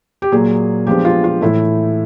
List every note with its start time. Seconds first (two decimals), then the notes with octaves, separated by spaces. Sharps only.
0.22 G4
0.32 A#2 F#3 A#3 G#4
0.87 F3 G#3 B3 D4 G4
1.05 F4
1.24 F4
1.41 A2 E3 A3 E4